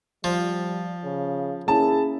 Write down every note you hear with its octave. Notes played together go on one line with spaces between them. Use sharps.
F3 G3
C#3
A#3 C#4 E4 G#4 A5